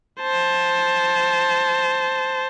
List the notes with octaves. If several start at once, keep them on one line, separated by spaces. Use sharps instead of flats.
C5 A5